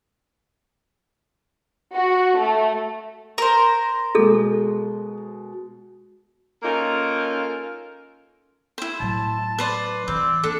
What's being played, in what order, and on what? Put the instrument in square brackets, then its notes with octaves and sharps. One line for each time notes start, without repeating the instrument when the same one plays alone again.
[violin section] F#4
A3
[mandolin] A#4 C5
[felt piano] B2 G#3 [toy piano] G#4 A4
[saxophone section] A#3 C#4 D#4 F4 A4 A#4
[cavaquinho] E4 C5
[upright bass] A2 F#3 [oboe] A5
[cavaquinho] B4 C5 D5
[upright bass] E3 F4 [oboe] C4 [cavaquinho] D5
[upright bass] A#3 [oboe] D4 [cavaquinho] A4